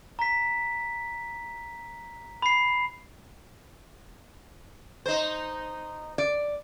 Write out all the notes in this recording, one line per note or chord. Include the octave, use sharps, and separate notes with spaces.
A#5 B6
B5 C7
D#4 C5
D5